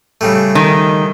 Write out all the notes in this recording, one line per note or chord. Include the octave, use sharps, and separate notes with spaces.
C#3 G3 A3
D#3